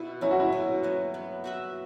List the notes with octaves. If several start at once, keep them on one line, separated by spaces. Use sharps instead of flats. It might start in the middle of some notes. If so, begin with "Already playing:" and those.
Already playing: B2 E4
F#3 C#4 E4
F#4
E4
B2
F#3 C#4
B3
F#4 B4 E5